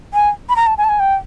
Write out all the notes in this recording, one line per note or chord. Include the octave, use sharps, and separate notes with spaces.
G#5
B5
A#5
A5
G#5
A5
G#5
G5